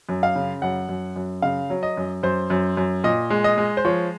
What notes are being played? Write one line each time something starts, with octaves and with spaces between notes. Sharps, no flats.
F#2
F5
C#3
F#2 F#5
F#2
F#2
C#3 F5
F#3
D#5
F#2
F#2 C5
F#2
F#2
A#2 D#5
G#3
D#5
G#3
C5
F3 C#5